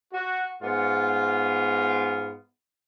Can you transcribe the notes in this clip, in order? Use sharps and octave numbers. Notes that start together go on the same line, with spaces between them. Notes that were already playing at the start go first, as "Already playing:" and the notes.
F#4
G#2 B3 F4